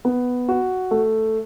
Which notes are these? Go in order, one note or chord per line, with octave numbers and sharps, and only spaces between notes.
B3
F#4
A3